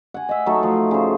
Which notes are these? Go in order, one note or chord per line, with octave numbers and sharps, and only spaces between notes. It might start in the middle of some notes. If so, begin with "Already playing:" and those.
F#5 G#5
D#5 E5
F#3 A3 D#4 A4
F3
C#3 C5